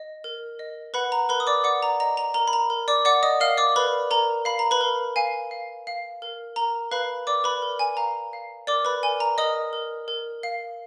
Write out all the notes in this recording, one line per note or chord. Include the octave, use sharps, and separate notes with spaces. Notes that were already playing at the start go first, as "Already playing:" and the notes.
Already playing: D#5
A#4
D#5
B4 F#5 B5
A#5
A#4 B4 B5
D#6
D5 D6
D5 F#5 D6
A#5
D#5 A#5
A#5
A#4 A#5
B5
A#5
A#4
D5 D6
D5 F#5 D6
D#5 D#6
A#4 F5 F6
D5 D6
A#4 B4 B5
A#4 A#5
F5 B5
A#5
B4 B5
A#4
F5 G#5
F5
F5
A#4
A#4 A#5
B4 F5 B5
A#4 D5 D6
B4 B5
A#4
G#5
F5 A#5
F5
A#4 D5 D6
B4 B5
A#4 G#5
A#5
A#4 D#5 D#6
A#4
A#4
F5